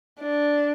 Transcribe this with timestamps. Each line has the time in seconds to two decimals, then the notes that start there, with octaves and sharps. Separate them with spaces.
0.20 D4